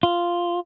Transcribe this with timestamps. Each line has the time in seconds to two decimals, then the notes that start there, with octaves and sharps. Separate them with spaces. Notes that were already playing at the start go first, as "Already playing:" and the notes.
0.03 F4